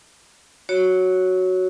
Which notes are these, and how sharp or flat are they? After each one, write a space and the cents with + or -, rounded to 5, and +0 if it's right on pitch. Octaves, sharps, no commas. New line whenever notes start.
F#4 +0 C#5 +0